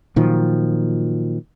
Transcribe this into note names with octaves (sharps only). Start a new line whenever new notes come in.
A#2 D#3 F3 F#3